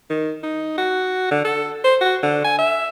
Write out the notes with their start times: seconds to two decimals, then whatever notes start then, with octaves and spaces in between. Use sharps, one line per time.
0.10 D#3
0.43 D#4
0.78 F#4
1.31 D3
1.45 A4
1.84 C5
2.01 F#4
2.23 D3
2.44 G#5
2.59 E5